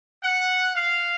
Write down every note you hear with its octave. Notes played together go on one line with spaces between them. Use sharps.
F#5
F5